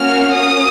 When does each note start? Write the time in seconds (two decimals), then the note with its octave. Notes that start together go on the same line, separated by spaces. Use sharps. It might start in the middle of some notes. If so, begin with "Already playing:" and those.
Already playing: A#3 C#4 F#4 F6
0.33 D#6